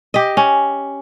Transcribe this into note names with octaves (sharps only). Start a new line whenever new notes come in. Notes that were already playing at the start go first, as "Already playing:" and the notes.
G4 D#5
C#4